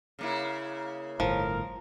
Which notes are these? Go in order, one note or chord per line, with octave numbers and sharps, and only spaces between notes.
C#3 A#3 E4
G1 A2 F3 A#4